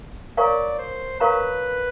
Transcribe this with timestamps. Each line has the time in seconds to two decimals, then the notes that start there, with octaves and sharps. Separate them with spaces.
0.37 A#4 C#5 D5 F5 A#5 C#6
0.79 C5
1.20 A#4 B4 C#5 F5 A#5 C#6